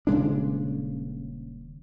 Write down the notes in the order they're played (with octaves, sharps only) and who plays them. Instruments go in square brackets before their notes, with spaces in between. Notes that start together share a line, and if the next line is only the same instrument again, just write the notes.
[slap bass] D#1 C#3 G#3 D4